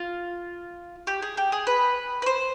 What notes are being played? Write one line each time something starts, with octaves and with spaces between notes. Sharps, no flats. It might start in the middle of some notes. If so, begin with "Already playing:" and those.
Already playing: F4
G4
G#4
G4
G#4
B4
B4
C5